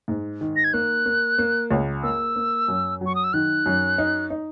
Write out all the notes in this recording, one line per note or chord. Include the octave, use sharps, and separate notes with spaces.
G#2
D#3
A#6
G#6
A#3 F#6
A#3
A#3
C#2
A#3 E6
A#3
F#2
F#3
C#6
D#6
E6
D#3 F#6
F#2
D#4
D#4